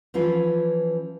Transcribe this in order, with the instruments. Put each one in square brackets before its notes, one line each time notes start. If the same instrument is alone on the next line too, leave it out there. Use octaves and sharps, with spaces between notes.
[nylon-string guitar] E3 F3 C#4 F4 B4